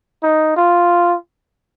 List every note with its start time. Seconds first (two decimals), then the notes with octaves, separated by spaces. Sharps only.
0.23 D#4
0.56 F4